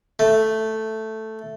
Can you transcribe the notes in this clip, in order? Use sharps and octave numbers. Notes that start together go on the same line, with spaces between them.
A3